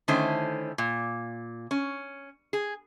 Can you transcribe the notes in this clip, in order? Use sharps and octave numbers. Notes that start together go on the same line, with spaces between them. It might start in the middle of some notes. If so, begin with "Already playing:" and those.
D3 D#3 A3 C#4 E4 C5
A#2
C#4
G#4